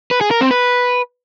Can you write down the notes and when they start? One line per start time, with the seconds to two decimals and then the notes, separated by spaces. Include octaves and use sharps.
0.11 B4
0.21 G#4
0.31 A#4
0.41 C4
0.51 B4